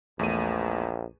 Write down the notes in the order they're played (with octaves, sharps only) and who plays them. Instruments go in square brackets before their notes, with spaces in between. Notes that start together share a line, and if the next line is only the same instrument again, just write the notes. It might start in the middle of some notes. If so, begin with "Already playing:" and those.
[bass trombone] A#1 [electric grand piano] E2 A3 D#7